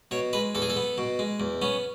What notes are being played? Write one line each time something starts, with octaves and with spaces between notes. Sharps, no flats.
B2 C#5
G#3 B4
E2 A4
G#4
A4
B3
B2
G#3
E2
B3 C#4